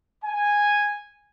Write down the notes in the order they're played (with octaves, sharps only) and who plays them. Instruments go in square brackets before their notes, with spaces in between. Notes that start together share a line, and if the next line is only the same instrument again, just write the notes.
[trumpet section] G#5